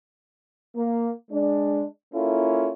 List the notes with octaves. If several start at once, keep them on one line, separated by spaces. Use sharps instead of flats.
A#3
G#3 D4
A#3 C#4 E4 F4 A4